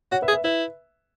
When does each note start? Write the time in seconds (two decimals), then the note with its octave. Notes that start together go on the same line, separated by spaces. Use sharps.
0.12 F#4 C#5 F#5
0.22 B4 E5
0.28 G#4
0.33 B4 E5
0.44 E4 B4 E5